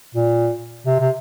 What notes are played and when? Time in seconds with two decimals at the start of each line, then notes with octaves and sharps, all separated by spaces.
0.15 A#2
0.86 C3
1.00 C3